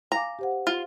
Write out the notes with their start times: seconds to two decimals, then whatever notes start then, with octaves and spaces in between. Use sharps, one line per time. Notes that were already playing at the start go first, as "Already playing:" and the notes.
0.12 F5 G#5 A#5 D6
0.39 G4 C5 F#5
0.67 F4